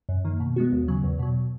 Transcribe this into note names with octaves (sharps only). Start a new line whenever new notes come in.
F#2
D#3 A#3
B2
G#3 B3 F#4
D#2
C#3 F#3
E2
B2 F#3